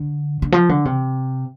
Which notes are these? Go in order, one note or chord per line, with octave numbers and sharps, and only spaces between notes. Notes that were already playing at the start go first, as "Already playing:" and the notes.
Already playing: D3
D3
F3
D3
C3